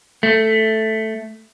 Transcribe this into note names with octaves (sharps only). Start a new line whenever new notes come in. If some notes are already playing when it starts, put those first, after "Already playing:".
A3